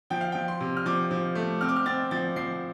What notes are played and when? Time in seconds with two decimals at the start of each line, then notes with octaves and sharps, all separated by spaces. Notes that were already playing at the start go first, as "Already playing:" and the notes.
0.10 F3 G5
0.21 F5
0.32 F3 G5
0.48 C6
0.60 C3
0.77 F6
0.86 F3 D6
1.11 F3
1.35 A3
1.61 C4 F6
1.69 D6
1.76 F6
1.86 C4 A6
2.11 F3 A6
2.36 F3 C7